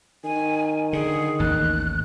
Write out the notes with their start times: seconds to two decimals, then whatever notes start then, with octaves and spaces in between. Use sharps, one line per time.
0.24 D#3 G#5
0.93 D3 G#4
1.40 A1 D#2 F#6